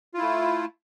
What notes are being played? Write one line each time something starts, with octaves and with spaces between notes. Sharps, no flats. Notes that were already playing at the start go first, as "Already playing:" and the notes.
A3 E4 F4